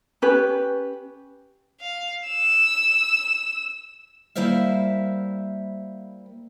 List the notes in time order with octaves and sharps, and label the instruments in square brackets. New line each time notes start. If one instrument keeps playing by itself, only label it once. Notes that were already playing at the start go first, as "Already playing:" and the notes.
[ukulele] C#4 G4 B4
[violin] F5
E6
[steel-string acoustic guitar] G3 A#3 E4 C5 E5 F5